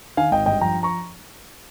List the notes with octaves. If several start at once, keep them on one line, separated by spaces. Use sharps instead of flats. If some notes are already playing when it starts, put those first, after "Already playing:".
D#3 F5 G#5
G#1 D#5 G5
G2 D#5 G5
F3 G5 A#5
A#5 C#6